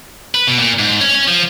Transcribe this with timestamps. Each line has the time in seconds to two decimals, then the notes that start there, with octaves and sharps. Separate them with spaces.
0.35 B4
0.47 B2
0.59 A#2
0.79 G#2
1.01 C#4
1.15 C#4
1.28 F3